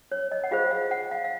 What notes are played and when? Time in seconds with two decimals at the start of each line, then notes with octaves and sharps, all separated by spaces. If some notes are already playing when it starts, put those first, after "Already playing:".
0.12 C#5
0.32 D#5
0.44 F#5
0.51 F4 G#4 C5 F5
0.71 F5
0.91 F#5
1.11 F5
1.24 F5